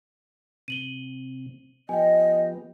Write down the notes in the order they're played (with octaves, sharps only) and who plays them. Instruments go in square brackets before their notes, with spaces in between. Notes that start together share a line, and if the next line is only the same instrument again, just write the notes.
[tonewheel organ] C3 [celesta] D#7 F#7 G7
[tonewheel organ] F3 B3 G4 [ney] D#5 [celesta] G5 G#5